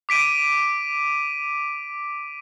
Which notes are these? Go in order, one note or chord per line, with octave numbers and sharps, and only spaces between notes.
D6 B6 D7 D#7